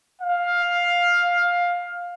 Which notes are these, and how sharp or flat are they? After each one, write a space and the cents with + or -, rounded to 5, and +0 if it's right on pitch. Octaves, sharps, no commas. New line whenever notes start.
F5 +10